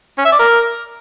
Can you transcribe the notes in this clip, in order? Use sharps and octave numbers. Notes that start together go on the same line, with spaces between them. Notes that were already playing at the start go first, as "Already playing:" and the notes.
C#4
E5
D5
A#4